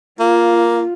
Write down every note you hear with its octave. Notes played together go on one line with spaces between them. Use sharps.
A#3 F4